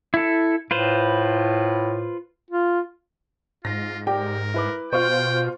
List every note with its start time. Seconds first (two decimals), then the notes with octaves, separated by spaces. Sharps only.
0.14 E4 A4
0.71 A2 F4 B4 C5
2.50 F4
3.65 G#2 F4 A#6
4.07 G4 A#4 D5 G5
4.54 E4 B4 D6
4.93 B2 F4 C5 G5 C#6